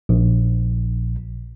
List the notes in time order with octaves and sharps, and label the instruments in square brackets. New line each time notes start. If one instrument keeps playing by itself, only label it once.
[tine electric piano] A#1